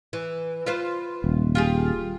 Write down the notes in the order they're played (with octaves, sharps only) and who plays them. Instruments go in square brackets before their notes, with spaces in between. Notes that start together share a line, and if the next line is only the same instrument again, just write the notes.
[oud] E3
F4 B4 C5
[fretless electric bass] D#1
[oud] F4 G4 G#4